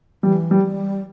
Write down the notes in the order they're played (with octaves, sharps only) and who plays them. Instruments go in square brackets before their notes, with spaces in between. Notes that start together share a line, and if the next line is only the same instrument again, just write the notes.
[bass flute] E3 [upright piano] G3
[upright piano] G3
[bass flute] G3